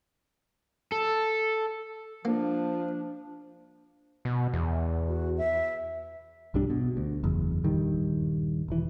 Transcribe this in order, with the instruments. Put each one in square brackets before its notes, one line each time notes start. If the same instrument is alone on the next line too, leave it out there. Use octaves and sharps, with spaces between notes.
[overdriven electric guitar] A4
[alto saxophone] F3 [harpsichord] A#3 [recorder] D4
[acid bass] B2
E2
[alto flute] F#4
E5
[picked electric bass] B1 G2 G3 D4
B2
D2
F#1 E2
D#1 G2 D#3 G3
E1 E3